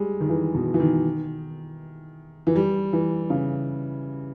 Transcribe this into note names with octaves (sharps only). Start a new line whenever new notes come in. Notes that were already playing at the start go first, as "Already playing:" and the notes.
Already playing: G3 G#3
D#3
E3
B2
E3
D#3
E3
G3
E3
C#3